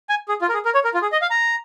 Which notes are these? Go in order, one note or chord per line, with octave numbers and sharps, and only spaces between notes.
G#5
G#4
F4
A#4
G#4
A#4
C#5
A#4
F4
G#4
D#5
F5
A#5